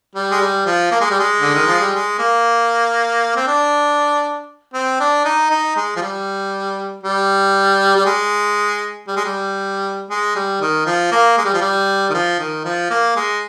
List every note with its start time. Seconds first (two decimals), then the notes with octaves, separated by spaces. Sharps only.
0.15 G3
0.31 G#3
0.41 G3
0.66 F3
0.92 A#3
1.01 G#3
1.11 G3
1.20 G#3
1.41 D3
1.54 D#3
1.67 F3
1.80 G3
1.94 G#3
2.19 A#3
3.36 C4
3.47 D4
4.74 C4
5.00 D4
5.25 D#4
5.51 D#4
5.76 G#3
5.96 F3
6.01 G3
7.04 G3
7.96 G3
8.06 G#3
9.08 G3
9.17 G#3
9.25 G3
10.10 G#3
10.36 G3
10.61 D#3
10.86 F3
11.12 A#3
11.38 G#3
11.45 G3
11.54 F3
11.61 G3
12.10 D#3
12.14 F3
12.39 D#3
12.65 F3
12.90 A#3
13.16 G#3